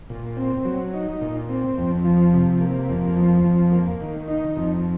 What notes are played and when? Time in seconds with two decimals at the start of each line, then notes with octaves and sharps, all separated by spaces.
0.10 A#2
0.37 C4
0.65 F#3
0.94 D#4
1.21 A#2
1.49 C4
1.77 F2
2.04 F3
2.33 C3
2.61 A#3
2.89 F2
3.16 F3
3.44 F2
3.72 A#3
4.00 D#3
4.28 D#4
4.56 F2